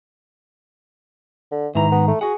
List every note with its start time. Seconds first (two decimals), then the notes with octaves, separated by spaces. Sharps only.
1.52 D3
1.75 G#2 D#3 E3 A#5
1.92 B3
2.08 A3
2.21 F#4 G#4 F#5